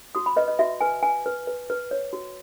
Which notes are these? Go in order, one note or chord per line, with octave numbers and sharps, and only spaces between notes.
F#4 D#6
B5
B4 D#5
D#5
F#4 E5
B4 G#5
B4 G#5
B4
B4
B4
C#5
F#4